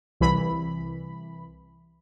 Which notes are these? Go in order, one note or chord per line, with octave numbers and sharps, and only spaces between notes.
C2 E3 B5